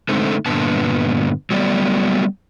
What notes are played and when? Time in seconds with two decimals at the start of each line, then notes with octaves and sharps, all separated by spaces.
0.09 D3 G#3 A3 C4 D#4 A4
0.46 G2 A#2 D3 B3 A5
1.51 F#3 G3 A3 B3 D5